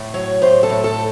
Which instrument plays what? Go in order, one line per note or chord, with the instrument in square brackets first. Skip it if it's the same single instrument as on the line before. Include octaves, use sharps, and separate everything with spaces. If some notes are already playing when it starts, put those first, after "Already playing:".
Already playing: [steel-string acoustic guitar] A2
F#3 C#5
A2 C5
A4
A2
A4